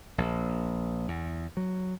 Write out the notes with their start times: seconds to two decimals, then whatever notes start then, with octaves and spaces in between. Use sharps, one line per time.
0.18 A#1
1.08 E2
1.57 F#3